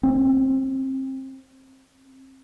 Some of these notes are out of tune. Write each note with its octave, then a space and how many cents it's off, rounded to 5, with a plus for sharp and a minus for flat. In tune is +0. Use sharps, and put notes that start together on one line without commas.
C4 +25